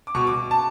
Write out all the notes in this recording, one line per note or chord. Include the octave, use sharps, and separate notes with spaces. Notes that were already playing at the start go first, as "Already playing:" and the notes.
D6
B2 C#6
B2 D6
A5